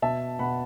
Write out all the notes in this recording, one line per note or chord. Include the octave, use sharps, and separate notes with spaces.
B2 E5 A5
B2 F#5 B5